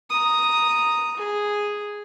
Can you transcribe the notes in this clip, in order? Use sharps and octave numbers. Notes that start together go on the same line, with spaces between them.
A#5 D#6
G#4